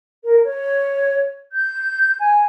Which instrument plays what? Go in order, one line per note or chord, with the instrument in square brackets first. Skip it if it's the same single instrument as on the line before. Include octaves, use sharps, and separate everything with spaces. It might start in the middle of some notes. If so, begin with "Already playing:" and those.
[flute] A#4
C#5
G6
G#5